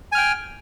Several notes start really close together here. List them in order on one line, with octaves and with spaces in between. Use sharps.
G#5 F6 G5